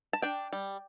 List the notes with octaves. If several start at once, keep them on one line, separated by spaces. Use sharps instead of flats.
A5
D4 G5
G3